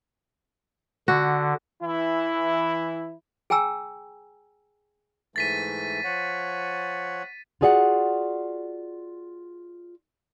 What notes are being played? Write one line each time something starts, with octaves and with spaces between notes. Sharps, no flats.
D3 F#4
E3 E4
G#4 G5 G#5 A#5 E6
G#2 E3 A3 A6 B6 D#7
F3 C#5 F#5
F4 F#4 G#4 D5 F5 F#5